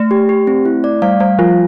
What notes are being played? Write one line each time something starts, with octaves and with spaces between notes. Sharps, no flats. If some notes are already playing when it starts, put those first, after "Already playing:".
Already playing: A3
G4
G4
C4
E4
D5
G3 F5
G3 F5
F3 F4